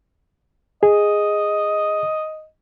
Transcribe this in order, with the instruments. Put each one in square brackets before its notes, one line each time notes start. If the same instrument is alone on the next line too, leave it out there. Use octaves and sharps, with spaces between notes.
[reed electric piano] G#4 [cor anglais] D#5